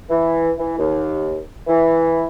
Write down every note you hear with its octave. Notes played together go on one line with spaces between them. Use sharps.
E3
E3
D#2
E3